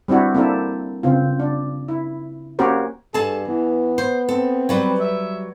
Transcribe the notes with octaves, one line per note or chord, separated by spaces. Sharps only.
G3 C4 D4 E4 F#4
A#3 C4 D4 E4 A4 A#4
C#3 C4 F4
D4
E4
A#3 C#4 F#4 G4 A#4 C5
G2 G#4 A4 A5
E3 B3
C5
C4 A4
F#3 G3 B4
E5